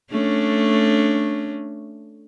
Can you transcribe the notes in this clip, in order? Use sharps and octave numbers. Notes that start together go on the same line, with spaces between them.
A3 C#4 D4